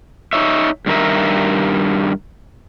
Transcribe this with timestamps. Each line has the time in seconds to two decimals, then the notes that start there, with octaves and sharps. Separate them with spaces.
0.33 D#4 C#5 E5
0.86 G2 D#3 A#4 E5